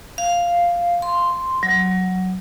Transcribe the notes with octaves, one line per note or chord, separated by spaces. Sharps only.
F5
C6
F#3